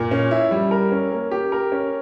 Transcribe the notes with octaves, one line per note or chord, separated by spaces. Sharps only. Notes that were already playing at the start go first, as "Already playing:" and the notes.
Already playing: A#2
C#4
E4
G3
A#4
C#4
A#3
G4
A#4
C#4